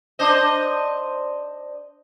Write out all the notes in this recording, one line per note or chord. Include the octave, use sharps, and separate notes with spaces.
D4 C5 D#5